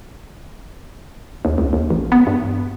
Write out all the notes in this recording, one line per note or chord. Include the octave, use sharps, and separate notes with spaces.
D#2
C#2
D#2
A1
B3
G2